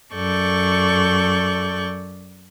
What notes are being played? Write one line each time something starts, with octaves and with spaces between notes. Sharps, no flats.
F#2 A4 D5 C#6 G6